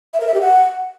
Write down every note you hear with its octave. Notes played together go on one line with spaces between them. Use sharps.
E5
A#4
E5
G4
F#5